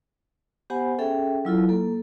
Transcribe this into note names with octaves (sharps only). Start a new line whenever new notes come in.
B3 G4 C5 F#5 G#5 B5
C#4 G#4 A4 E5 G5
F#3 E4 F4 A4
A#3 A4